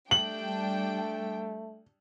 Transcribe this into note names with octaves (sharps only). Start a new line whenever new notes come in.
G3 A3 D4 G5 F#7